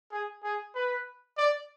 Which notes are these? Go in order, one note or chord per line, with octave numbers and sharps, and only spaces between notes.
G#4
G#4
B4
D5